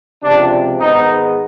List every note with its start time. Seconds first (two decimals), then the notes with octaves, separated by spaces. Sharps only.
0.23 C#2 C3 F3 D4
0.78 G#2 D#3 G#3 B3 D#4